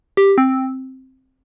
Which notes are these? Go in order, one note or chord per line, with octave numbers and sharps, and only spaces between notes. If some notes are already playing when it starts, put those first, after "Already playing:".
G4
C4